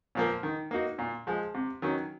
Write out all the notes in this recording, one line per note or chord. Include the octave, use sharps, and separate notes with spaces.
A#2 F3 A#3
D#3
A#3 D#4 F#4
A#2
F3 G#3
C3
D#3 F#3 C#4